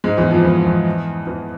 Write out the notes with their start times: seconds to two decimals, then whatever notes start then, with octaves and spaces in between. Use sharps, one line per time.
0.04 G#2 G#3
0.18 E2 E3
0.31 F2 F3
0.45 E2 E3
0.66 E2 E3
1.27 E2 E3